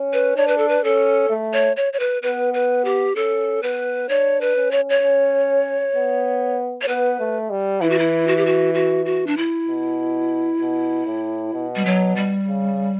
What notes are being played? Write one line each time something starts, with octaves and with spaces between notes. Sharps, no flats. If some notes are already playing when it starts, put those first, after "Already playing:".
Already playing: C#4
B4
D4 C#5
B4
A4
B4
C#4 A4
A3
C#5
C#5
C#5
B4
B3 B4
B4
G4
C#4 A4
B3 B4
D4 C#5
B4
C#4
C#5
C#5
C#4
B3
C#5
B3 B4
A3
G3
E3 E4
F#4
E4
F#4
G4
F#4
F#4
F#4
D4
E4
B2
B2
A2
B2
G3
F#3
G3
C#3